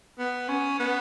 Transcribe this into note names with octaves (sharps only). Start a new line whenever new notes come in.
B3
C#4
B3